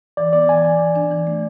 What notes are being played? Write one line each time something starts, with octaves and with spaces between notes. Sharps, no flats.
E3 D5
B3 D5
E3 G#5
E3
E3
D4
E3
A3